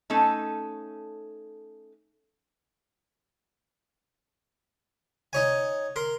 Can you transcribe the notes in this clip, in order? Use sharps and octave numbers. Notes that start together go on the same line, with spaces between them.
A3 C#4 D#4 A4
D#4 C#5 G#5
A#4 C6